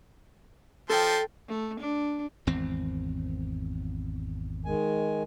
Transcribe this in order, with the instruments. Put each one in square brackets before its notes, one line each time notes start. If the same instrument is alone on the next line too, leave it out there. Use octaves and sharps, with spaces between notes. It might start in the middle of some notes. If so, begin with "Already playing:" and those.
[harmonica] F3 A5 C6 [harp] A4 G5
[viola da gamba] A3
D4
[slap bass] G#1 E2 C4
[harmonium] D#3 G#3 G#5